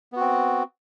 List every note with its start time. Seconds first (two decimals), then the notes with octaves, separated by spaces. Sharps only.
0.12 B3
0.16 F#4
0.20 C4